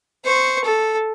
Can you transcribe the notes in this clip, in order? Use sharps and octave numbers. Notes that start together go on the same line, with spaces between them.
C5 C#6
A4